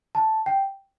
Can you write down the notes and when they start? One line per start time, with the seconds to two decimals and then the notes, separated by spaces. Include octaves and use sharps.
0.15 A5
0.46 G5